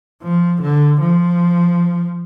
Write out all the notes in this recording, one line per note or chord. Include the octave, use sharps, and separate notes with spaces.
F3
D3
F3